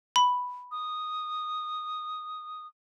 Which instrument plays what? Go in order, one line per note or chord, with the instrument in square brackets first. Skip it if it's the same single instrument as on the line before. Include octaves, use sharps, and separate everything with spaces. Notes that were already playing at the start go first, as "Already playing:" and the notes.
[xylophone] B5
[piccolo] D#6